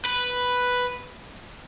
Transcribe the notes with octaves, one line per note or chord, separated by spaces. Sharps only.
B4